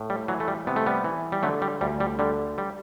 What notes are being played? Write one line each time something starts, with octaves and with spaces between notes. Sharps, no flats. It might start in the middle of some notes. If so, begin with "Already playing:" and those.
Already playing: A2
G3
E3 F#3
A3
G3
C3 B3
A3
G3 B3
E3
G3
D3 F#3 A3
G3
D2 G3
G3
D3 G3
G3